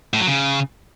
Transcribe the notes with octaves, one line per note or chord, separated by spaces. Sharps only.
A2
F#3
C#3